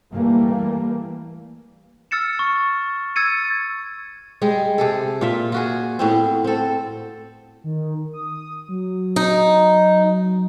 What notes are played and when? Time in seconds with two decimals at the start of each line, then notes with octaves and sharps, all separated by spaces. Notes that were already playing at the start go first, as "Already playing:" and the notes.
0.13 E3 G3 A3 A#3
2.11 E6 F6 A6 C#7 E7
2.39 C#6
3.16 E6 G#6 A6 C#7 D#7
4.41 G3 G#3 G#4
4.78 C3 G#4 A4
5.21 A#2 F4 E5
5.52 F4 F#4 G#4
5.99 A2 B3 C4
6.44 C4 A4
7.64 D#3
8.14 D#6
8.69 F#3
9.16 D#4